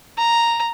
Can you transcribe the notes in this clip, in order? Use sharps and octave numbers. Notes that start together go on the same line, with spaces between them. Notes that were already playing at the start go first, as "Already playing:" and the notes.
A#5